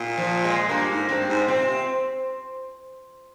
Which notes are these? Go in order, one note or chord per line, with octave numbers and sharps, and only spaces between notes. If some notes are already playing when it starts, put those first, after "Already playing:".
Already playing: A#2
F3
G#3
G2 A#3
G#2
G2 C4
G#2
A#2 C4
C3